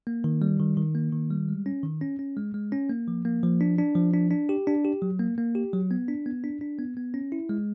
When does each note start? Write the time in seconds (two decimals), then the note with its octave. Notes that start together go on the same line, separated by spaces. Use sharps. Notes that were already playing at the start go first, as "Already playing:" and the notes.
0.07 A#3
0.24 D#3
0.42 G3
0.60 D#3
0.77 D#3
0.95 A#3
1.13 D#3
1.30 G3
1.49 G#3
1.66 C#4
1.83 D#3
2.01 C#4
2.19 C#4
2.37 G#3
2.54 G#3
2.72 C#4
2.89 A#3
3.08 F3
3.25 A#3
3.43 F3
3.61 D4
3.78 D4
3.96 F3
4.14 D4
4.31 D4
4.49 G4
4.67 D4
4.85 G4
5.02 F#3
5.20 A#3
5.38 A#3
5.55 G4
5.73 F#3
5.91 B3
6.08 D4
6.26 B3
6.44 D4
6.61 D4
6.79 B3
6.97 B3
7.14 C#4
7.32 E4
7.49 G#3